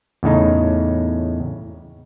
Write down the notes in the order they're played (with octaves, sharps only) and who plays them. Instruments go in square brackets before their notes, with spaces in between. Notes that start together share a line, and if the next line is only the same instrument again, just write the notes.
[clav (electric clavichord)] E2 A2 C#3 D#4